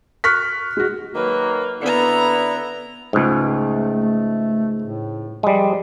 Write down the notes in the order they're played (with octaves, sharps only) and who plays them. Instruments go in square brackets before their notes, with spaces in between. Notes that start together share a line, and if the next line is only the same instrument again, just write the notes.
[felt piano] C#6 F6 F#6 B6
G#3 F#4
[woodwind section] D#3 F#3 A#3 [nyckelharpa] B4
[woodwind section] D3 E4 [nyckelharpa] B3 A#5
[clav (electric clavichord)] C#2 G#2 [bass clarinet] A3
[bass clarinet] A3
A2
[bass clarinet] F3 [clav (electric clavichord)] G3 G#3